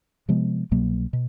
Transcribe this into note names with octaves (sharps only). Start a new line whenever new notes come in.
C3 F3 G#3 B3
C2 B2 F#3 A#3
B2